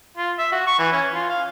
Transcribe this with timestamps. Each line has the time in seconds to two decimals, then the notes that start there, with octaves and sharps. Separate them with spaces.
0.17 F4
0.39 E5
0.52 F#4
0.67 C#6
0.79 E3
0.93 C#4
1.14 F4
1.30 F5